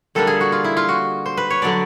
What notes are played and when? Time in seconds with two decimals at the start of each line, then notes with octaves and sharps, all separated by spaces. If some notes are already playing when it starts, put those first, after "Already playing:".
0.15 D3 G3 A#3 D4 A4
0.27 G#4
0.41 F#4
0.52 F4
0.64 E4
0.77 F4
0.89 F#4
1.26 C5
1.37 B4
1.50 C#5
1.62 D3 F#3 B3 D4 D5